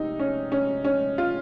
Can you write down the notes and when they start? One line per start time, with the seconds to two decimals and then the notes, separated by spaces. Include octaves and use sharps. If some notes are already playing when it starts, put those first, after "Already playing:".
Already playing: C3 D#4
0.20 C#4
0.52 C#4
0.85 C#4
1.18 F4